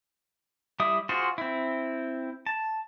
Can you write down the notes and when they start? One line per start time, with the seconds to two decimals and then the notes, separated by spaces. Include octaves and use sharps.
0.80 G3 E4 E5 D#6
1.09 F4 F#4 G#4 C5
1.38 C4 E4
2.46 A5